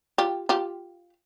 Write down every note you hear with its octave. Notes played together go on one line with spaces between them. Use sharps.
F4 G4
F4 G4